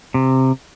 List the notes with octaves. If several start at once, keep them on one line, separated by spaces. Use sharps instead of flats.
C3